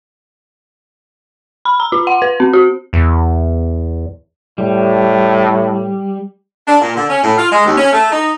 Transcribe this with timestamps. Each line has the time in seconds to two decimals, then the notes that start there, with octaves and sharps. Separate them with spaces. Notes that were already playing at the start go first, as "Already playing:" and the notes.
1.65 B5
1.80 A#5
1.92 F4
2.07 F#5
2.22 B4
2.40 C4
2.53 F#4
2.93 E2
4.58 A2 G3
6.67 D4
6.81 A#2
6.96 D3
7.09 C#4
7.23 A2
7.37 F4
7.51 G#3
7.65 D#2
7.77 C#4
7.93 A3
8.10 D#4